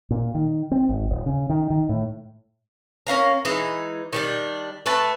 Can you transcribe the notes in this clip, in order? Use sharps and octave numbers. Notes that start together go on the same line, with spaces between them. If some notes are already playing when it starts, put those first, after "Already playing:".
A#2
D#3
C4
G#1
D#1
C#3
D#3
D#3
A2
A#3 C#4 F5 A#5
E3 G#3 D#4
D#3 G3 D4
A3 B4 A5